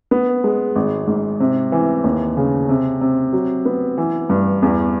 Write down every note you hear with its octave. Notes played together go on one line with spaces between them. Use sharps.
B3
G#3
G#1
G#2
C3
E3
D#2
C#3
C3
C3
F#3
B3
E3
G2
E2